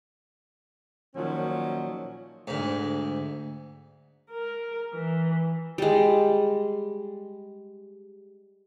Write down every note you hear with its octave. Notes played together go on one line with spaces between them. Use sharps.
A#2 D#3 F3 F#3 C#4
D2 G#2
A#4
E3
G3 G#3